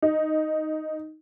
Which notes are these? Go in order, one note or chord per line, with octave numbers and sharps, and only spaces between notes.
D#4